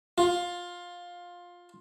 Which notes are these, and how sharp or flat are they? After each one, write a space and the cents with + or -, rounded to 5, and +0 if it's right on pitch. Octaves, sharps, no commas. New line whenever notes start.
F4 +15